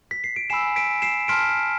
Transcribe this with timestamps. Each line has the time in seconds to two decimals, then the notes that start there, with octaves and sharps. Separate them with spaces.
0.11 B6
0.24 C7
0.36 D7
0.50 G#5 B5 E6 C7 E7
0.76 B6 D7
1.02 C7 E7
1.28 A5 C6 F6 B6 D7